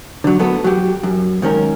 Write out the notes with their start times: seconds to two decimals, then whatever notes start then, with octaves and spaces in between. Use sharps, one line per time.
0.24 D3 F#3
0.39 F#3 A3 B3 A4
0.64 F#3 G4
1.03 F#2
1.42 G#2 D#3 C#4 A#4